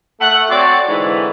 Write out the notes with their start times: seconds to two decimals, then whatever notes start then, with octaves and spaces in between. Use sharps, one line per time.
0.21 A3 F#5
0.50 C4 F#4 C#5 D5
0.89 G#2 D3 E3